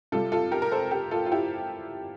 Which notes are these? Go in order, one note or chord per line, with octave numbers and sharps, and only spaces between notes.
C3 G3 F4 A4
F4 A4
G4 A#4
A#4
A4 C5
G4 A#4
F4 A4
F4
E4 G4